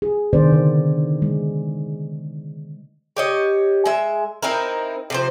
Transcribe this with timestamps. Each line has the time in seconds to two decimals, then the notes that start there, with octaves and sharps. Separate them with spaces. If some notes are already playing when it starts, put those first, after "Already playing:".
0.02 G#4
0.33 C3 D#3 B3 D4 C5 D5
0.52 D3 C5
1.22 G#3
3.17 G4 C#5 D#5
3.86 G#3 E5
4.43 C4 D#4 E4 A#4
5.10 C3 F3 C5